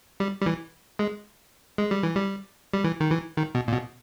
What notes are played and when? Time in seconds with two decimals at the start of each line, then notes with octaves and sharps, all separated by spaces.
0.20 G3
0.42 G3
0.46 E3
0.99 G#3
1.78 G#3
1.91 G3
2.03 E3
2.16 G3
2.73 G3
2.84 E3
3.00 D#3
3.11 E3
3.37 D#3
3.55 B2
3.68 A#2
3.72 B2